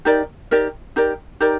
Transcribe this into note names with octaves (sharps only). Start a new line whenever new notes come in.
D#4 G4 A#4 D5
D#4 G4 A#4 D5
D#4 G4 A#4 D5
D#4 G4 A#4 D5